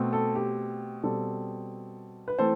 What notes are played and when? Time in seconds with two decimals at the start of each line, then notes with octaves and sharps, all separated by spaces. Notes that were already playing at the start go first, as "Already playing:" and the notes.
Already playing: B2 A3 C4
0.13 A4
0.35 G4
1.03 B2 G3 C4 A4
2.28 B4
2.39 E3 A3 C4 A4 C5